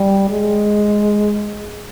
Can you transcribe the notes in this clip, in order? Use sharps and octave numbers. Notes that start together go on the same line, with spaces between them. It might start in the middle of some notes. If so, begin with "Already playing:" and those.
Already playing: G3
G#3